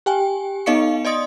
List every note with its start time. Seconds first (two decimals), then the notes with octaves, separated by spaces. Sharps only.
0.06 G4 G5 G#5
0.66 B3 D#4 D#5 F5 C#6 C#7
1.05 D5 D#5 C6 D#6